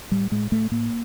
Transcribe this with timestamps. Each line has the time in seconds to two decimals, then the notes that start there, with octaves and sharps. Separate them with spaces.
0.11 A2 G3
0.31 A2 G#3
0.51 A2 A3
0.71 A2 A#3